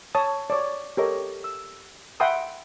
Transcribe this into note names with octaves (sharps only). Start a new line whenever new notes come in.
C#5 A5 D#6
C#5 D5
G4 A4 A#4 C#5 D#5
E6
E5 F#5 G5 B5 C6 D#6